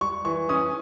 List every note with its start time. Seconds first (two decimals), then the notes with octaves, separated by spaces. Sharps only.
0.01 G3 C#6
0.25 E3 C#6
0.49 C#4 D#6